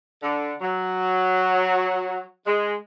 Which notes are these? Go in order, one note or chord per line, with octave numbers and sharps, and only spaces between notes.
D3
F#3
G#3